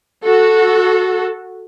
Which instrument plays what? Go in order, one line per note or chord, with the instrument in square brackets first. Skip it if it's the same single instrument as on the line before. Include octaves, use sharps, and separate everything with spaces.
[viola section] F#4 A4